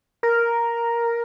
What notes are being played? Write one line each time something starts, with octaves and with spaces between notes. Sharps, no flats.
A#4